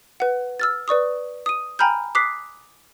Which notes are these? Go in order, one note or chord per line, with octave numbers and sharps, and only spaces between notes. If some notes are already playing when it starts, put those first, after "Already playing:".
B4 F#5
E6 F6 A6
B4 D5 C#6 D#6
D#6 D#7
G5 G#5 A#5 B5 F6 G6
D6 D#6 F#6 B6 C7